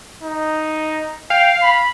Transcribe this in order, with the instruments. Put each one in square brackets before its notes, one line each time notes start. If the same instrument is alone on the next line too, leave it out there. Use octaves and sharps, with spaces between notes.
[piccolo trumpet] D#4
[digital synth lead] F5 [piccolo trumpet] G5
[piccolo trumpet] B5